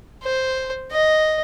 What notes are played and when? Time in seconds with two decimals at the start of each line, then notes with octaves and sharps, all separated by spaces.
0.23 C5
0.92 D#5